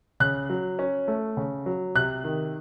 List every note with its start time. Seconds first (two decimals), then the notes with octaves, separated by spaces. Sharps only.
0.20 C#3 F#6
0.50 F#3
0.79 C#4
1.08 A3
1.37 C#3
1.66 F#3
1.95 C3 F#6
2.24 D#3